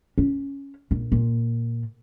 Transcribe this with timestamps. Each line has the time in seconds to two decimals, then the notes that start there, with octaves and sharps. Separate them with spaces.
0.18 C#4
0.91 A#1
1.12 A#2